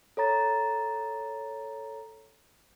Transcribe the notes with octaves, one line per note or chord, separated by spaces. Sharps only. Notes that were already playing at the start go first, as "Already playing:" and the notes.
A4 C#5 A#5 A6